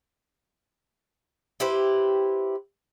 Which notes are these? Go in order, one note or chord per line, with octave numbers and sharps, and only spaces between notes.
E4 G4 B4 C5